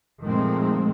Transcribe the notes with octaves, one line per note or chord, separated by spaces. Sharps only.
A#2 D#3 F3 G#3 A3 C4